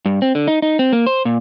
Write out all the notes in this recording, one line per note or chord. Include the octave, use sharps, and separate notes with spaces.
G2
C4
D3
D#4
D#4
C4
A#3
C5
A#2